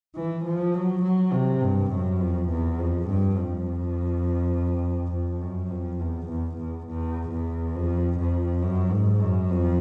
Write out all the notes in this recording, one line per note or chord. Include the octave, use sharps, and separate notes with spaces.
E3
F3
F#3
F#3
C3
G2
F#2
F2
E2
F2
G2
F2
F2
F#2
F2
E2
E2
E2
E2
E2
F2
F2
F#2
G#2
F#2
F2